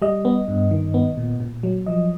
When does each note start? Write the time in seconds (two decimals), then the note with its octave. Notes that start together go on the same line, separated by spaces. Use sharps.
0.02 G3 D#5
0.25 B3
0.48 G2
0.71 D#3
0.94 B3
1.17 A#2
1.40 A#2
1.63 F#3
1.86 F3 D#5